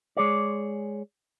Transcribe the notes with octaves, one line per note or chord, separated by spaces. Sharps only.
G#3 G#4 C#5 D5